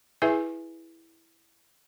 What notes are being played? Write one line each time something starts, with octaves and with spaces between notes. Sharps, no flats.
E4 G#4 B4 E5 G#5